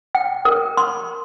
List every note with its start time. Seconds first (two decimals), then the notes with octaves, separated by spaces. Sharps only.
0.15 G5
0.45 A#4
0.77 C6